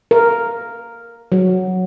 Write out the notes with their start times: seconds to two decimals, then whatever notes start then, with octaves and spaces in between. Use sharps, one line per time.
0.11 A#4
1.32 F#3